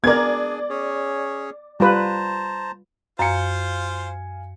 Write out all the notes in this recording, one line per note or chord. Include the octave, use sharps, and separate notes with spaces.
B3 D4 G#4 A#4 D5 G#5 G#6
C#4 G#4 C#5
G3 F4 B4 C5 A5 A#5
F#2 F4 C5 F5 G#5 C#7